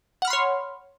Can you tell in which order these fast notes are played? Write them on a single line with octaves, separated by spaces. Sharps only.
F#5 F6 B5 C6 C#5